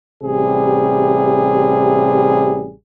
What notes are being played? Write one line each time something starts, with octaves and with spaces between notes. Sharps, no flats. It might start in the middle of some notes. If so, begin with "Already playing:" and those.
A1 C3 G3 G#4